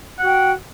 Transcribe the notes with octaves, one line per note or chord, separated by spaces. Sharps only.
F#4 F#5 G5